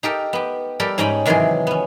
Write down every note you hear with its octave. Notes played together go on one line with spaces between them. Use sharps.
D#4 G4 A4 A#4
B3 G4
G3 G4 A4 A#4
G#2 C#4 D#4 D#5 G5 B5
C3 D#3 E3 F#3 C4 G#4
B3 C#4